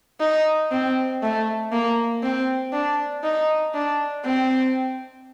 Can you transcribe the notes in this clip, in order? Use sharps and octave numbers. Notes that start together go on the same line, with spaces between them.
D#4
C4
A3
A#3
C4
D4
D#4
D4
C4